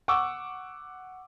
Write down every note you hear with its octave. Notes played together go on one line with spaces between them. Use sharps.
F#5 C#6 D6 E6